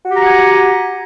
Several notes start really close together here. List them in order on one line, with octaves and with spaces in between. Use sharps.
F#4 G4 A#5 F#5 G#5